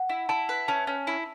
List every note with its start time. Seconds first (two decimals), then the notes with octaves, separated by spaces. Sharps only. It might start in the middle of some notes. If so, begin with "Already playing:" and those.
Already playing: F#5
0.09 E4
0.29 E4 A5
0.49 B4
0.68 C#4 A5
0.87 C#4
1.07 E4